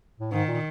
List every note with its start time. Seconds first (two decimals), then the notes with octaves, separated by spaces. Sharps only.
0.20 A2
0.32 G#2 D#3
0.48 A#2